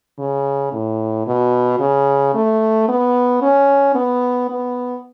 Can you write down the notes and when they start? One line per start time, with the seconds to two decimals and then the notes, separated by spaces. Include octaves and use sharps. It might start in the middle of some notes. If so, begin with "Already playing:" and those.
0.19 C#3
0.73 A2
1.27 B2
1.80 C#3
2.35 A3
2.88 B3
3.42 C#4
3.95 B3
4.49 B3